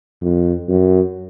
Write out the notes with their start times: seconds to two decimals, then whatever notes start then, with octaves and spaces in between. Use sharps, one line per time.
0.22 F2
0.68 F#2